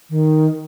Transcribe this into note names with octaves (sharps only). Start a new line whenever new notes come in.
D#3